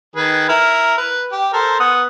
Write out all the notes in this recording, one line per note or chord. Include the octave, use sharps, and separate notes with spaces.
D#3 G#4 B4
E4 A#4 F6
B4
G4
A4 A#4 C5
B3 F#5 D#6